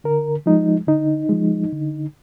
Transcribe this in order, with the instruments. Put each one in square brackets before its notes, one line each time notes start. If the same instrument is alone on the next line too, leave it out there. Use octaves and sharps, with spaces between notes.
[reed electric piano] D3 A#4
F3 G#3 D#4
D3 D#4
F3 G#3
D3